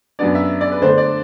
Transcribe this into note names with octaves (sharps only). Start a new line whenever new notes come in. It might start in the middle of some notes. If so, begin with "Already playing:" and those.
F#2 F#3 B3 D4 D5
E5
D5
B4
D3 A3 D4 C5
D5